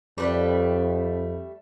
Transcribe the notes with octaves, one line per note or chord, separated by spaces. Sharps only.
F2 G3 A3 B4